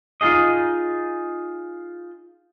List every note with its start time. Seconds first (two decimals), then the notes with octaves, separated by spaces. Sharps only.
0.21 D#4 F4 G#4 D#5